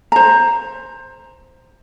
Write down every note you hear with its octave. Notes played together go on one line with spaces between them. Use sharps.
C5 A#5